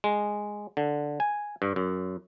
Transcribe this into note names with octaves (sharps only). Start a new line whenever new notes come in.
G#3
D3
G#5
G2
F#2